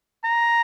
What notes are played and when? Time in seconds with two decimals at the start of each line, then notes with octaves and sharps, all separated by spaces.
0.24 A#5